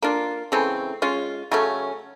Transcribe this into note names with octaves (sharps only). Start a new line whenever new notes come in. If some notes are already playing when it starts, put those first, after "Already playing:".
A#3 D4 F4
C#3 E3 A3 C4
G#3 C#4 F4
C#3 F#3 A3 C#4